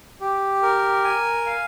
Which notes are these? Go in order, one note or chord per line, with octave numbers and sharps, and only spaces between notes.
G4
A#4
G#5
F5